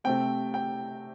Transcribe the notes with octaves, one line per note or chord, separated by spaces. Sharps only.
C3 A3 C4 G5
G5